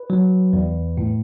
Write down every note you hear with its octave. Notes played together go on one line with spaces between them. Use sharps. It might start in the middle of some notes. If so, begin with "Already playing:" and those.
Already playing: B4
F#3
E2
A2